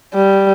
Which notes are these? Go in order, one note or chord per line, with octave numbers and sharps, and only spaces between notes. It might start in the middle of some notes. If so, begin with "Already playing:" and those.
G3